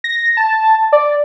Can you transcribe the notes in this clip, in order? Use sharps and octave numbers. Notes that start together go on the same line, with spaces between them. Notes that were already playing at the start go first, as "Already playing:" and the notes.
A#6
A5
D5